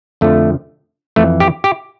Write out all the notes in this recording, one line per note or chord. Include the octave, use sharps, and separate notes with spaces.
F2 D3 F3 A3
F2 E3 A3
G4
G4